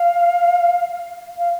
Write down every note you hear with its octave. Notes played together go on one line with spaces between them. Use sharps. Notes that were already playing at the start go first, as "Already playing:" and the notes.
Already playing: F5
F5